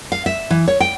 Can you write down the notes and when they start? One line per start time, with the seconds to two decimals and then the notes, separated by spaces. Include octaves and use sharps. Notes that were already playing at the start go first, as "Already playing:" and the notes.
0.12 F5
0.26 E5
0.51 E3
0.68 C#5
0.80 G5